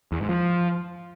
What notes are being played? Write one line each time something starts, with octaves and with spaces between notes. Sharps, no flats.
E2
G#2
F3